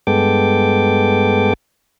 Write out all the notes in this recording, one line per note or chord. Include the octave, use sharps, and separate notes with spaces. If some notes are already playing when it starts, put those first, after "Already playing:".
G2 G#3 B3 A4 G5 D6